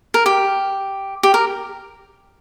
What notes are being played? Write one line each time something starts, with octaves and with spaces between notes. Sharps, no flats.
A#4
G4
G4
A#4